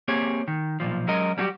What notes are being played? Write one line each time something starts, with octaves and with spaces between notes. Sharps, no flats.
A#3 C4 G4 G#4 C#5
D#3
B1 E2 A#2 F3
F#3 G#3 C#4 A#4 D#5
F#3 G3 C#4 D#4 F#4 G4